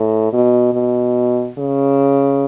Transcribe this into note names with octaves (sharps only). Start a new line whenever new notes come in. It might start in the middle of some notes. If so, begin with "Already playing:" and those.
Already playing: A2
B2
B2
C#3